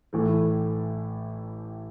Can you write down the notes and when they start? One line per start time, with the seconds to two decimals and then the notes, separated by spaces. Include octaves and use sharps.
0.13 A1 A2 E3 A3